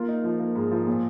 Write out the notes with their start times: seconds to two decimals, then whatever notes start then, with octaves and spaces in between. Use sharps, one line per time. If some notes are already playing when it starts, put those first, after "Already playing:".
Already playing: A#3 F4
0.08 D#4
0.24 F3
0.40 A#3
0.55 G#2
0.72 F3
0.87 A#2